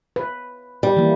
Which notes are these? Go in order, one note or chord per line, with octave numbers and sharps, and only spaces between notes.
B4
G3
E3 A#3